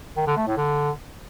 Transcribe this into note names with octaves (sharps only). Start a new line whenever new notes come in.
D#3
D3
A3
A2
D3